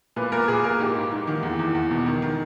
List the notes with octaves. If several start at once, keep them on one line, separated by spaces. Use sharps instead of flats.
A#2 B4
A#2 A#4
A#2 G#4
A#2 A#4
G#2 G4
G#2
G#2
D#3
E2
E2
E2
B2
D#3
D#3